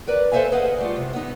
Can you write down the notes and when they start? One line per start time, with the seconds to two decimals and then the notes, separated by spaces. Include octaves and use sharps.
0.07 A#4 B4 D5
0.32 A4 C5 C#5 E5 F5 G#5
0.52 G#4 B4 D#5 F5 F#5
0.78 G3 A3 F4
0.96 C3
1.13 B3 D#4